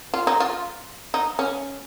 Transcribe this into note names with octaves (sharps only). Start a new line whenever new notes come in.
F4
D#4
F4
D#4
C#4